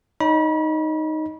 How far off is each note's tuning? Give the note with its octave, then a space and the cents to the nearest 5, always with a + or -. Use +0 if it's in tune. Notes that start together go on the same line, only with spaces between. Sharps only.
D#4 +0 C#5 +25 B5 -35